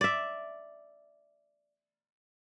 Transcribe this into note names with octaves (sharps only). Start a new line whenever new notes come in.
D5 E5